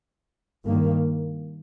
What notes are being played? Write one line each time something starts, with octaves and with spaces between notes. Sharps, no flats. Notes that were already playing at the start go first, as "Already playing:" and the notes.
G2 D#3 A#3